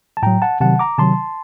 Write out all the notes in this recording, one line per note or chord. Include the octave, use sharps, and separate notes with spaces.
A5
A2 F#3 G5 A#5
F#5 A5
C3 D#3 F#3 F#5 A5
A#5 D6
C3 D#3 F#3 A5 C6